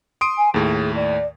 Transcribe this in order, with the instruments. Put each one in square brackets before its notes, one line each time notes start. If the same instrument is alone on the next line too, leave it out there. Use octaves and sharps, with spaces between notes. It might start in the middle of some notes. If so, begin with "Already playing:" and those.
[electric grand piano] C6 D#6 D7
[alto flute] G#5
[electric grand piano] D#2 A2 [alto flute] G#4
[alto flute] D5